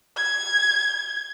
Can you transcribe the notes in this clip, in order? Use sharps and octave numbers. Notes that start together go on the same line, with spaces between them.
G#6